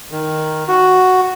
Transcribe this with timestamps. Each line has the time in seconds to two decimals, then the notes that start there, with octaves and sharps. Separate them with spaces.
0.11 D#3
0.68 F#4